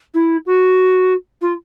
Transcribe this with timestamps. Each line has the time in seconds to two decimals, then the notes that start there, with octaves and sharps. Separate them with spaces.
0.14 E4
0.46 F#4
1.41 F4